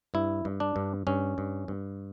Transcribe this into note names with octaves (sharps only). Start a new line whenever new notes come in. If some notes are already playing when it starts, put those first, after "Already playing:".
G2 E4
G2
D4
G2
G2 C#4
G2
G2